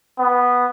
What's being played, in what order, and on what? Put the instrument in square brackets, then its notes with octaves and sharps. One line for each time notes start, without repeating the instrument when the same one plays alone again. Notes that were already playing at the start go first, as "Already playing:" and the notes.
[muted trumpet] B3